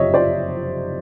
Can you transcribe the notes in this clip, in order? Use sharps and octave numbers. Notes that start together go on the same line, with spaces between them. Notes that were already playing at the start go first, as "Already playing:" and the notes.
Already playing: F#1 F2 C3 C#5 D#5 E5
C5 D5